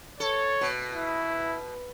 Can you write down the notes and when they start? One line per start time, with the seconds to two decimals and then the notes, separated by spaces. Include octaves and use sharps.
0.20 A4 C#5
0.61 B2
0.92 E4